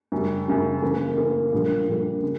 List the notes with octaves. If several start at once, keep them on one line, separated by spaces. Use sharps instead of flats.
F#2 C#3 G3
F#2 C#3 G3
C#3 E3 A#3
C#3 E3 A#3
A#1 A#2 G3 A#3
A#1 A#2 G3 A#3
C#3